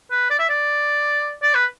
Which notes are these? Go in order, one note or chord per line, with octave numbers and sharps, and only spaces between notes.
B4
D5
E5
D5
D5
B4